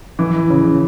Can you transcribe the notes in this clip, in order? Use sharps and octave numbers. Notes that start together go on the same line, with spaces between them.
E3
C#3